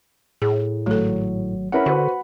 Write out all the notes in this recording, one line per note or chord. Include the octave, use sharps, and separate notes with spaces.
A2 G#4
G#1 F#3 A3 A4
C#4 E4 A#4 F#5 B5
D3 F#4 B4 C5